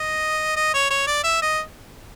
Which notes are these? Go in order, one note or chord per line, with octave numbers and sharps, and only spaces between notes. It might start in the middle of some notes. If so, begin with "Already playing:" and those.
Already playing: D#5
D#5
C#5
C#5
D5
E5
D#5